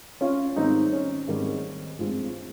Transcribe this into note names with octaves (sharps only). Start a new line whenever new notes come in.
C#4 F4
G#2 D#3 G3 C4 D#4
C#4
G#2 D#3 G3 C4
G2 F3 G#3 C4